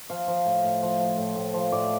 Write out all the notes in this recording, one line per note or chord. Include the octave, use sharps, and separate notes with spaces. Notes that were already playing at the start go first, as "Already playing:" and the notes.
F3 F5
F3
A2
A2
F3
F3
A2
A2
F3
A2 D5